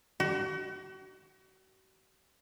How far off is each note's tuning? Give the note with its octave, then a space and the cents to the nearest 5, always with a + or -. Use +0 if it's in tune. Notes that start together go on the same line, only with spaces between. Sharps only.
F#4 +40